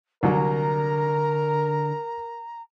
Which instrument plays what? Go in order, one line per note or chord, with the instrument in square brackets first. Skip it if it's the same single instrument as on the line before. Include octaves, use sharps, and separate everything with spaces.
[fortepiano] C2 F#3 [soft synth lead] D3 [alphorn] A#4 [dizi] A#5